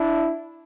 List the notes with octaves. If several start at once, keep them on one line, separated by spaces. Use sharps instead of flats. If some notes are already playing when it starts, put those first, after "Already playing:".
Already playing: D4 E4